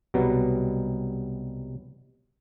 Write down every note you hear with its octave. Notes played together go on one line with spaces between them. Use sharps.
C2 B2 F#3 G3 B3